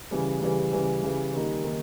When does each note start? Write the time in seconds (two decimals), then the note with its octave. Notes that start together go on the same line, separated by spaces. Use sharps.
0.11 C#3 E3 G3
0.41 C#3 E3 G3
0.72 C#3 E3 G3
1.02 C#3 E3 G3
1.33 D#3 G3 A#3 D#4
1.64 D#3 G3 A#3 D#4